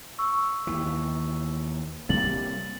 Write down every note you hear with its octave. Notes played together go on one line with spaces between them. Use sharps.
C#6 E6
D#2 E3
C3 G3 A#3 A6 F#7